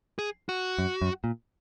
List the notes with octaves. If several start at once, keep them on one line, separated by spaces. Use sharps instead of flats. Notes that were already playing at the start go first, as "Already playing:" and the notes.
G#4
F#4
F#2
F#2
A#2